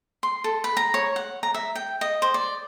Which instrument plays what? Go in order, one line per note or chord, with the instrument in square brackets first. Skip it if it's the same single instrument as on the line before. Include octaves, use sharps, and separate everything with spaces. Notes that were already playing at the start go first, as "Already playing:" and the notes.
[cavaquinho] C6
A4
B4
A#5
C#5
F#5
A#5
E5
G5
D#5
C5
D5